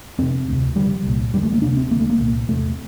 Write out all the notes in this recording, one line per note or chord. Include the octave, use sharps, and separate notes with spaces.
F2 C3 C4
D2 C3
F2 D3 G3
C2 A#2
F2 D3 G3
A3
A#3
D2 C3 D4
C4
D2 A#3
D3 A3
A#3
C2 A#2
E2 C3 A3